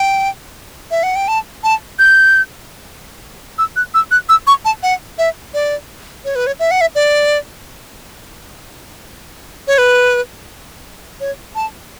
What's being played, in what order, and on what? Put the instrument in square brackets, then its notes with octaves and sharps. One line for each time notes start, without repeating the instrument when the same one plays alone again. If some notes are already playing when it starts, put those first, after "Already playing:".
Already playing: [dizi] G5
E5
F#5
G5
A5
A5
G6
E6
F#6
E6
F#6
E6
C#6
A5
F#5
E5
D5
C#5
B4
C#5
E5
F#5
E5
D5
C#5
B4
C#5
A5